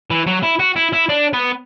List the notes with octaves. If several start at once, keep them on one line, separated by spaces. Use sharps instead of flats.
E3
F#3
E4
F#4
E4
E4
D4
B3